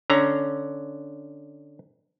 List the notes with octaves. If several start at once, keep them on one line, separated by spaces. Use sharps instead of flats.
D3 C#4 A#5